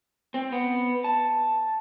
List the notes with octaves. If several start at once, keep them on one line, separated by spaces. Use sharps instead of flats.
C4
B3
A5